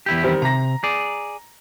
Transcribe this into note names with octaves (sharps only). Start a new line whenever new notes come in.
E2 E4 G4
D#3 G3 C4
C3 A#5 A#6
G#4 D5